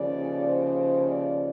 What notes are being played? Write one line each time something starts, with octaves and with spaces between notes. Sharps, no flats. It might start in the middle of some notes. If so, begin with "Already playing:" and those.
Already playing: D#2 C#3 F3 D5
C5
D5